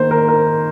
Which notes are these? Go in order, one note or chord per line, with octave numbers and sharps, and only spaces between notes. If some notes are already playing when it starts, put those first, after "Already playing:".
Already playing: D#3 A#3 C5
A#4
A#4